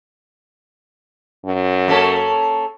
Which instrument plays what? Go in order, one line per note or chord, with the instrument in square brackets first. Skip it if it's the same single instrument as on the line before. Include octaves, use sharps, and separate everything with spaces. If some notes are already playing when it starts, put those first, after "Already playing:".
[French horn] F#2
[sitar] A#3 C#4 A4